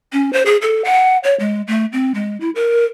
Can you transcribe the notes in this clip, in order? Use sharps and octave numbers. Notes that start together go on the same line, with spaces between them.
C#4
C5
G#4
A4
F#5
C#5
G#3
A3
C4
G#3
E4
A#4